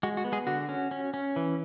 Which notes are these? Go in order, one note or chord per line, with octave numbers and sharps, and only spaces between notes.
G#3 F#4
F#4
B3
G#3 G#4
D3 F#4
C#4
C#4
C#4
E3